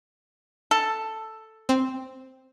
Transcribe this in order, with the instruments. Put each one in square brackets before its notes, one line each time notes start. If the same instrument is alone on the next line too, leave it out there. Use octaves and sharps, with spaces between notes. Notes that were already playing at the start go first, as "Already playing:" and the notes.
[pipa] A4
[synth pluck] C4